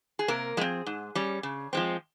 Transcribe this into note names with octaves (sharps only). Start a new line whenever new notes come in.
G#4
C3 A#3 A#4
F3 G#3 C4 G#4
G#2
G3 C#4
C#3
F3 G#3 C4